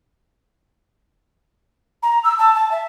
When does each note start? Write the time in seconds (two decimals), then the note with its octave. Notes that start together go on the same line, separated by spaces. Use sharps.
2.02 A#5
2.24 E6
2.38 A5
2.55 A5
2.71 E5